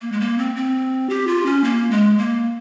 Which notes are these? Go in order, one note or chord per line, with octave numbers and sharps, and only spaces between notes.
A#3
G#3
A#3
C4
C4
G4
F4
C#4
A#3
G#3
A#3